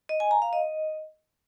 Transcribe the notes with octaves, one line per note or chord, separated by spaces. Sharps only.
D#5
G#5
A#5
F5
D#5